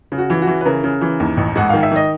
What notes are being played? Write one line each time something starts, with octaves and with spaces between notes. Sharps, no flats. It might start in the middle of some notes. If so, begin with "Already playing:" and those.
C#3
F#4
E3
F#4
E3
B4
C#3 A#4
C#3
E3
D#2
A1
G#2 F#5
D#3 F5
E5
D#3 D#5